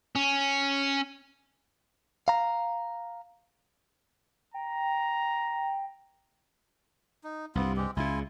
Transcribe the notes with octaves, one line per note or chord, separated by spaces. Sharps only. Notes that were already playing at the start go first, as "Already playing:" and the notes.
C#4
F5 A#5
G5 A#5
D#4
C2 G2 B3 C4 F4
G#3 C4 G4
C#2 C#3 E4 F4 G#5